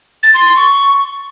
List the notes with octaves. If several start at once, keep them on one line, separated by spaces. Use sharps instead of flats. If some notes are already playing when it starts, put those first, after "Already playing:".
A6
C6
C6
C#6